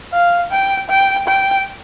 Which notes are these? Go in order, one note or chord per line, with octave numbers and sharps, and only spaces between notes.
F5
G5
G5
G5